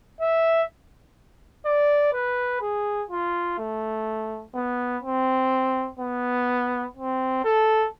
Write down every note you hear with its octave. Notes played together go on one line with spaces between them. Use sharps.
E5
D5
B4
G#4
F4
A3
B3
C4
B3
C4
A4